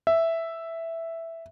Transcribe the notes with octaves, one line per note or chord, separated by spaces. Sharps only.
E5